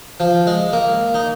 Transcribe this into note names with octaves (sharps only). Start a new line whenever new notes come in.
F3
G#3
A#3
D#4